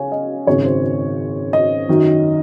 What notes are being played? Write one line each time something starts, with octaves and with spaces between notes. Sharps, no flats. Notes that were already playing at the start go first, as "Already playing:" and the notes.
Already playing: C#3 C#5 F5 G#5
D#5
G#1 F#2 C#3 C#5
C5
D#5
F#2 D#3 F#3